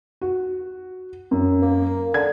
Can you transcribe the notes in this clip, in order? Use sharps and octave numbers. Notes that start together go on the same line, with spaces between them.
F#4
F#2
A#3
D3 G#6